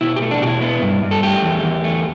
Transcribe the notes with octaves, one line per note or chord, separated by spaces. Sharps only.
B2 E4
G4
A3
D4
B2 E4 G4
B3
G2
G2
A4
A3 G4
E2
E2
A3